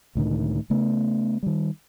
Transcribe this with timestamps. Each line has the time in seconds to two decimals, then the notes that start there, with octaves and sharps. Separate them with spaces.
0.15 C#2 A2 D3 D#3
0.70 C#3 A3 B3
1.43 D#3 G3